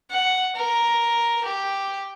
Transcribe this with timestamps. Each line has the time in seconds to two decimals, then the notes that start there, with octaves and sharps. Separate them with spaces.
0.11 F#5
0.56 A#4
1.44 G4